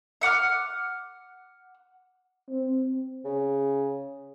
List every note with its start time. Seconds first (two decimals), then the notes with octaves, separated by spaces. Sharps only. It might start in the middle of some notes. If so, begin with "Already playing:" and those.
0.21 E5 F#5 D6 F6
2.49 C4
3.25 C#3